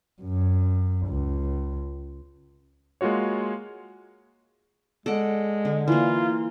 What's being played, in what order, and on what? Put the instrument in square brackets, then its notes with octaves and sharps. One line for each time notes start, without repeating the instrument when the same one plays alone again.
[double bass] F#2
C#2
[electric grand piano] G#3 A#3 F4 F#4 C#5
[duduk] G#3 [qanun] A4 D5 F#5
[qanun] D3
[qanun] E3 A#3 [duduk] F4